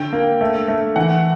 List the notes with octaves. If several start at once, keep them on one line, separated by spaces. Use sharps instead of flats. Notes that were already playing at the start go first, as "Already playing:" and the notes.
Already playing: D3 G5
A#3
A3
A3
E3 F#5